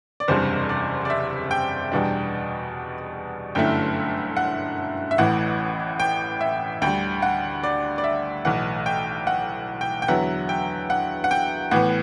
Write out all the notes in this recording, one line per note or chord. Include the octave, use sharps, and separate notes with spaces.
D5
F#1 E2 C3 G3 D4 C5
D5
D5
E5
G5
E2 B2 G3 D4
G1 F#2 D3 A3 E4 G5
F#5
E5
A1 A2 E3 F#5
G5
E5
D2 D3 G3 G5
F#5
D5
D5
E5
B1 A2 E3 F#5
G5
F#5
G5
G5
E2 D3 F#3 B3 E4 F#5
G5
F#5
F#5
G5
A2 E3 B3 F#5